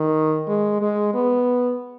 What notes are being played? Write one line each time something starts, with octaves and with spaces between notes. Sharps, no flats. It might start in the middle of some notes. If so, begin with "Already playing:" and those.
Already playing: D#3
G#3
G#3
B3